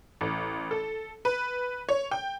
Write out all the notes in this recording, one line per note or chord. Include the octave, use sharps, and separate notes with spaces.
A1
A4
B4
C#5
G5